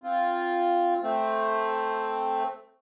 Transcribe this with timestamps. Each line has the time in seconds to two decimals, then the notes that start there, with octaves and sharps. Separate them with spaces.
0.04 C4 F4
1.03 A3 C4